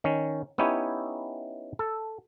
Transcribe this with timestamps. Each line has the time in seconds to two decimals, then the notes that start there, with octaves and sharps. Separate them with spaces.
0.04 D#3 C#4
0.58 B3 C#4 D#4 E4 G4 C#5
1.79 A4